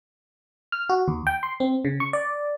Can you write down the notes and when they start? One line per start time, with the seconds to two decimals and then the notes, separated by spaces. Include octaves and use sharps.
0.72 F6
0.89 F#4
1.08 D#2
1.27 G5
1.43 C6
1.60 C4
1.85 C#3
2.00 C#6
2.13 D5